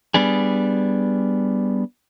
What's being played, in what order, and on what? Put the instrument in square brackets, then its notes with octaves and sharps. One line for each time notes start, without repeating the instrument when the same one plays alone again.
[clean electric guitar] G3 B3 D4 G#4